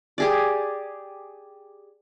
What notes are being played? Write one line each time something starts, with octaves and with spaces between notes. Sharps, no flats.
G4 G#4 D5